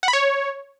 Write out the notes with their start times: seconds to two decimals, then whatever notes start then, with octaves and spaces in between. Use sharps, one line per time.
0.03 F#5
0.08 B5
0.13 C#5